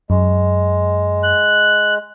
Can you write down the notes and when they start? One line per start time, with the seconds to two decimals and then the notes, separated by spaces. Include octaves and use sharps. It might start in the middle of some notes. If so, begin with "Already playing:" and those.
0.10 F#2 G#3
1.23 F#6